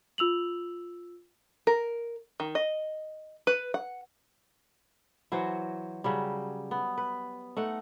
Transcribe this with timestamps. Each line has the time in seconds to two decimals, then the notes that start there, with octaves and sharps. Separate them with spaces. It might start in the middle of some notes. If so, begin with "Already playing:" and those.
0.18 F4 E6 F7 F#7
1.67 A#4
2.40 D#3
2.55 D#5
3.47 B4
3.74 F#5
5.32 E3 F#3 F#4 C5
6.04 C#3 F#3 G3
6.71 B3
6.98 B4
7.57 A3 D#4 F#5